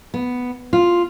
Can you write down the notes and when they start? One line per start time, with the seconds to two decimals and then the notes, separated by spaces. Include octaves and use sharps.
0.14 B3
0.73 F4